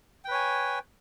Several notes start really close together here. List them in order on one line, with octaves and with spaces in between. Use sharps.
G5 B4 C#5 G#5